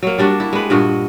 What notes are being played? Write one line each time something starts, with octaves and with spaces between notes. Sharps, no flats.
F#3 A#3
G3 D4 F#4
E4
G#3 B4
G2 A#2 F#4 D#5